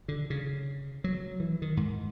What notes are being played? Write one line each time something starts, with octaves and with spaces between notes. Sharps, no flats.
D3
C#3
F#3
E3
D#3
G#2